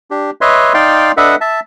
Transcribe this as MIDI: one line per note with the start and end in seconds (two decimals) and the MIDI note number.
0.11 0.31 62
0.11 0.31 67
0.41 0.73 71
0.41 0.73 73
0.41 0.73 75
0.41 0.73 76
0.41 0.73 84
0.74 1.12 63
0.74 1.12 74
0.74 1.12 77
0.74 1.12 79
0.74 1.12 84
1.17 1.36 62
1.17 1.36 69
1.17 1.36 71
1.17 1.36 75
1.17 1.36 76
1.17 1.36 78
1.41 1.60 76
1.41 1.60 81